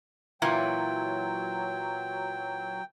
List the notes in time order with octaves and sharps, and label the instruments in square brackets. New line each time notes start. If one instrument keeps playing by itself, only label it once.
[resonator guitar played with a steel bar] A#2 E3 [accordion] F#3 [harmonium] G5